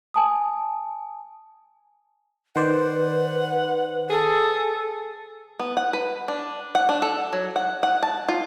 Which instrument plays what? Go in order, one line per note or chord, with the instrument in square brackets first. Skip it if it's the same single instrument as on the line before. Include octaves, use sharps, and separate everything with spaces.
[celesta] G#5 A5 D#6
[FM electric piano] D#3 C5 D5 [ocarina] B4 [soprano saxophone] F#5
[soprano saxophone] G#4 [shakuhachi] A4
[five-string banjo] B3
F#5
B4
D4
F#5
D4
A4
F#3
F#5
F#5
A5
F4